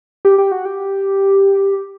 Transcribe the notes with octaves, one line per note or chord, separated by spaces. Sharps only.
G4
G4
F#4
G4